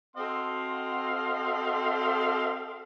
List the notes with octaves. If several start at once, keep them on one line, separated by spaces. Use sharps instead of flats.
C4 F#4 A4 D#5 F5 C6